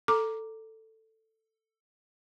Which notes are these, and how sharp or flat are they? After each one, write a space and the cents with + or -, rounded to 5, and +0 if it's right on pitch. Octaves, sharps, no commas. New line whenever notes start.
A4 +10 A#5 +0 D6 +0